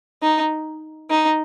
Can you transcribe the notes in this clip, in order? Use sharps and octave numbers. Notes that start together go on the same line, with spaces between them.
D#4
D#4